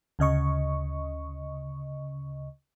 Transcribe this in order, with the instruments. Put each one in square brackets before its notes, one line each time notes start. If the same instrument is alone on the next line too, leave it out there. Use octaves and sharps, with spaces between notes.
[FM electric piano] D2 C#3 D#5 C#6